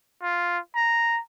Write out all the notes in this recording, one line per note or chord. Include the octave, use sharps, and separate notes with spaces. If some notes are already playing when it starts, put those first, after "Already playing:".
F4
A#5